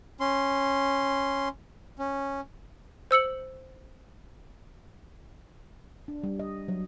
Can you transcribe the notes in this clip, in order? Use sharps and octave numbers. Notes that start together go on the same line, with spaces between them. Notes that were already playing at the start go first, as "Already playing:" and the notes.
C#4 C6
C#4
C5 E6 C#7 F#7
D4
G3
D#5
F#3